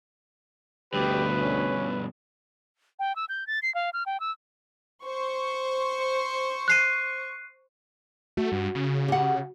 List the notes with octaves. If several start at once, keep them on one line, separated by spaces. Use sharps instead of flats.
D2 G2 B2 G4 B4
C#4
G5
E6
G6
A6
C7
F5
F6
G5
E6
C5 C#6
F#6 C7 D#7
A3 F#4
G2
C#3
G4 F#5